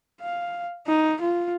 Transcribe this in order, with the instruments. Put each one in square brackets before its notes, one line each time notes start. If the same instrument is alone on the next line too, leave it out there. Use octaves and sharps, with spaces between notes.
[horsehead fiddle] F5
D#4
F4